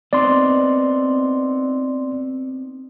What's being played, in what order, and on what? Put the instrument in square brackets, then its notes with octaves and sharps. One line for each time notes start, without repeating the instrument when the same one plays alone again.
[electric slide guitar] B3 C4 D#4 [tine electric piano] D5 C6